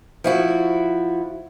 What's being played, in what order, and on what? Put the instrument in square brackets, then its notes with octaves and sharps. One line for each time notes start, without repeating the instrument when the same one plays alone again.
[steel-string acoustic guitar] F3 E4 F#4